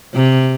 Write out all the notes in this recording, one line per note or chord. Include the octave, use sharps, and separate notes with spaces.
C3